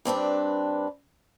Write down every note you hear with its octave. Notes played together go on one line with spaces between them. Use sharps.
G2 C4 D4 B4